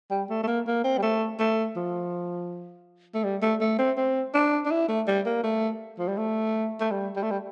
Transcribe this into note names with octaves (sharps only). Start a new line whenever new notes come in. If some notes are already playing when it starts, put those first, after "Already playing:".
G3
A3
A3
A#3
A#3
C4
G3
A3
A3
F3
A3
G3
A3
A3
C4
C4
D4
D4
E4
A3
G3
A#3
A3
F3
G3
A3
A3
G3
G3
A3
G3